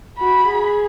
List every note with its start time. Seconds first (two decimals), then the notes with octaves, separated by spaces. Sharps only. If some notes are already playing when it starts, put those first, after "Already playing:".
0.19 F#4 B5
0.47 G#4